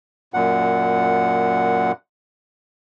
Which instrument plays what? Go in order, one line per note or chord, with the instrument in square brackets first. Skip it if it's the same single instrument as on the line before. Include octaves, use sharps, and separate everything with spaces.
[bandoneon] F#2 A#2 F#5